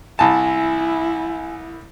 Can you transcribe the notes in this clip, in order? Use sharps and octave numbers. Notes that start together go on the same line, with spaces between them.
C2 E4 G#5 A5